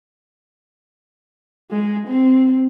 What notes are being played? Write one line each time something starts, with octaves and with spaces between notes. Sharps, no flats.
G#3
C4